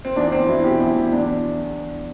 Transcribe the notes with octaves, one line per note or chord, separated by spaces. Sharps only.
C4
E2 D4
E2 C4
F#3 E4
B2 G4
E2 E4
E2
E2 D4